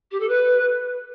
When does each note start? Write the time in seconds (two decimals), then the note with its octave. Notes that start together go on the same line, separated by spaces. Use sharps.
0.11 G4
0.20 A4
0.29 B4